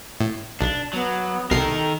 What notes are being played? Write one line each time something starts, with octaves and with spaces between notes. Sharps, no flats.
A2
B1 D4
F#3 B3
C2 B2 D#3 A4 A#4 C7